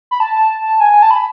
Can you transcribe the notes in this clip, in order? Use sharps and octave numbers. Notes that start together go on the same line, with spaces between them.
B5
A5
G#5
A5
B5